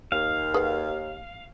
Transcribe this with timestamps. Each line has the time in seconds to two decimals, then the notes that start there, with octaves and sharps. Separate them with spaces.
0.12 D#2 F5
0.54 G#4 B4 F#5